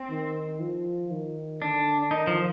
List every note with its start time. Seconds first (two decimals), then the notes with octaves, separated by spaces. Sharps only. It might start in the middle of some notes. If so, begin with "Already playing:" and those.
Already playing: C4
0.10 D#3
0.60 F3
1.10 D#3
1.61 D3 D4
2.11 D#3 D#4
2.27 F3